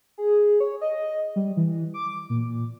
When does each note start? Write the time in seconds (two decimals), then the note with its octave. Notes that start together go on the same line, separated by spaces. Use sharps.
0.18 G#4
0.60 C#5
0.81 D#5
1.36 G3
1.57 E3
1.94 D6
2.30 A#2